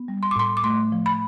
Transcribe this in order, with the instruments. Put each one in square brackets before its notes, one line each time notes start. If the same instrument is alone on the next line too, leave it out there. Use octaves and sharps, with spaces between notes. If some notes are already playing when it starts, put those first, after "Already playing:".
Already playing: [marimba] B3
G3
C6
D6
A2 C6
D6
A3 C6
F3
B5